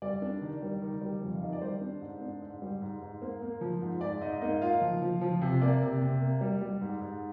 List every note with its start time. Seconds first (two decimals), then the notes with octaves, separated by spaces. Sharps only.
0.02 G3 D5
0.22 D4
0.42 D#3
0.62 G3
0.82 D#3
1.02 G3
1.22 F2
1.35 F5
1.41 D#3 D#5
1.53 D5
1.61 G3 C5
1.81 D4
2.02 G#2
2.21 D4
2.42 G#2
2.62 G3
2.82 G#2
3.02 G#2
3.22 A#3 C5
3.42 A#3
3.61 F3
3.82 G#2
4.01 G#2 D5
4.21 G#2 D#4 D#5
4.42 A#3 D#4 D#5
4.61 A#3 F4 F5
4.81 F3
5.02 F3
5.21 F3
5.41 C3
5.61 A#3 D5
5.82 C3
6.01 C3
6.21 A#3
6.41 G3
6.62 G3
6.81 G#2
7.01 G#2